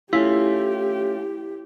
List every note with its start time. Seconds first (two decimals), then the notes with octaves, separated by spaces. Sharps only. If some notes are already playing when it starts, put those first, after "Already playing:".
0.13 A3 C#4 E4 F4 G4